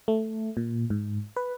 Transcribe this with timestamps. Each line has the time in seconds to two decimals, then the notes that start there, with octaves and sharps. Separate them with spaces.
0.08 A3
0.57 A#2
0.90 G#2
1.37 B4